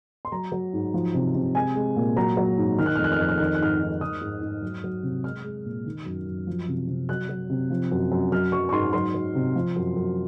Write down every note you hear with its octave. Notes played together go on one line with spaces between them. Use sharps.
C6
F#3 A#5
F#3
G#2
F3
C3
C3
G#3 G#5
G#3
A#2
F#3 A#5
F#3
G#2
D#3 F6
F#6
F2 F6
F#6
F6
F2 F#6
F6
D#3 F#6
F6
F#6
G#2 F6
G#2
D#3 D#6
G#2
G#2
F#3
F#3
C3
G#3 F6
G#3
A#2
D#3
F#2
F#2
F3
C3
C3
F#3 F#6
F#3
C3
F3
F#2
F#2
F#3 F6
F#3 C#6
C#6
G#2 C6
F#3 C6
F#3
C3
F3
F#2
F#2